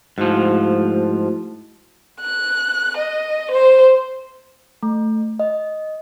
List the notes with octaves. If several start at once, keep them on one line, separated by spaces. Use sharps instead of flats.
G#2 F3 A3 E4 F#4
F#6
D#5
C5
A3
D#5